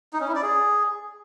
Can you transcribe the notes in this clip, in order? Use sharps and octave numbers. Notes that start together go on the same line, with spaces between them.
D#4
C#4
E4
D5
G#4